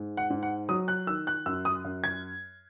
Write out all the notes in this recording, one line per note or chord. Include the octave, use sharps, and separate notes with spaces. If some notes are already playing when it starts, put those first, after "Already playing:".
Already playing: G#2
F#5
G#2
F#5
F#3 D#6
F#6
D#3 E6
F#6
F#2 E6
D#6
F#2
G#6